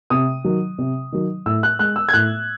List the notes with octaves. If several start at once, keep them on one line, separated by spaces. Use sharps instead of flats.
C3 D#6
D#3 F#3
C3
D#3 F#3
A2 E6
F#6
G#3 F#6
E6
G#6
A2 F#6